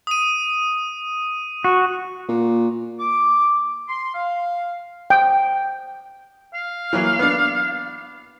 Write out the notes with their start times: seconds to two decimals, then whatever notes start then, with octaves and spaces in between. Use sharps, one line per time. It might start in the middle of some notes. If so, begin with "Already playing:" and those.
0.07 D#6 D#7
1.64 F#4
2.29 A#2
2.99 D6
3.88 C6
4.13 F5
5.10 G5
6.54 F5
6.93 E3 F#3 A#3
7.19 B3 D4